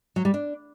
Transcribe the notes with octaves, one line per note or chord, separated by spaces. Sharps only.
F#3
G3
D4